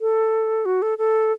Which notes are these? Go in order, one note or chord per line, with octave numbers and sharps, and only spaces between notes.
A4
F#4
A4
A4